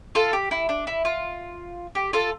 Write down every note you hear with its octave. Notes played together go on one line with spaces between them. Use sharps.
F4 A4
G4
E4
D4
E4
F4
G4
F4 A4